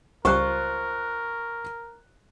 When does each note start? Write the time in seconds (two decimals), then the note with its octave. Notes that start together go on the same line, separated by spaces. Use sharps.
0.25 C#2 G3 F4 A#4 C5 C#6 F#6